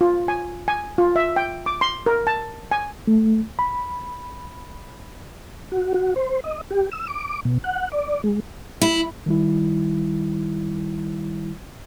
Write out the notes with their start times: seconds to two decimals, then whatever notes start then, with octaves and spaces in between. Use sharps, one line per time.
0.01 F4
0.28 G#5
0.68 G#5
0.98 F4
1.16 E5
1.36 G5
1.66 D6
1.81 C6
2.06 A#4
2.27 A5
2.71 G#5
3.07 A3
3.59 B5
5.72 F#4
5.94 F#4
6.16 C5
6.44 D#5
6.71 G4
6.92 E6
7.08 D6
7.45 B2
7.64 F#5
7.92 D5
8.24 G#3
8.82 E4
9.26 D#3 G3 E4